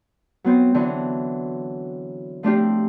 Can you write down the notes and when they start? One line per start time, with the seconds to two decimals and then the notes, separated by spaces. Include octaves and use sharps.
0.44 F#3 B3 C4
0.75 D3 E3 F#3 C4
2.43 F3 A3 C4 D4 F4 G4